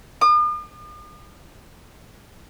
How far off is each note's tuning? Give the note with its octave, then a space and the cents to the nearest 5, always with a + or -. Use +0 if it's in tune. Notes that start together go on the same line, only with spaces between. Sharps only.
D#6 -45